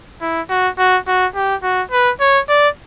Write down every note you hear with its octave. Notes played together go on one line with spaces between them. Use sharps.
E4
F#4
F#4
F#4
G4
F#4
B4
C#5
D5